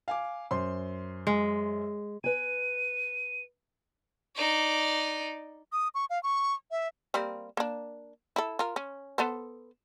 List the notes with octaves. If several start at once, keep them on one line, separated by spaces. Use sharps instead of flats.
F5 G#5 D6
F#2 C5 C6
G#3
B4 G#5 D#7
D#4 D5
D#6
C#6
F5
C#6
E5
G3 A#3 C4
A#3 D4
E4 A4
F4 A#4
C#4
B3 A4 C5